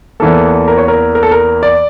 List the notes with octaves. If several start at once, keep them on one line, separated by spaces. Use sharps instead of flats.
E2 E3 A#3 A4
A#4
C#5
A#4
A#4
A4
A#4
D5